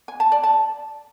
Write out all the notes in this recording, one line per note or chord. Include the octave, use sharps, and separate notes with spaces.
G#5
A5
D5
A5